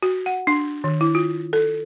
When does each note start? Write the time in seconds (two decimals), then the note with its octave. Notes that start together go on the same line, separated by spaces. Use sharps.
0.03 F#4
0.26 F#5
0.47 D4
0.84 D#3
1.01 E4
1.15 F4
1.53 A4